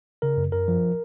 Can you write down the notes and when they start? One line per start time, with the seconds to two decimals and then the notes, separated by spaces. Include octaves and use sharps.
0.22 C#3 A#4
0.37 F#2
0.52 F#2 A#4
0.68 F3